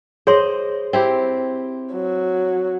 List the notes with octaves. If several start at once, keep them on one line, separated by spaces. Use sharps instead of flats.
G#4 C5 C#5 D#5 C6
C4 E4 G4
F#3